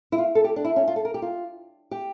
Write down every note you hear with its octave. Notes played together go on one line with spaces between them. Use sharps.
E4
F4
A4
G4
D4
E4
C#4
F4
A4
A#4
G4
F4
G4